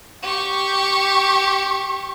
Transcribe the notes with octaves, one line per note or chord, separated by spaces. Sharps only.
G4 C#6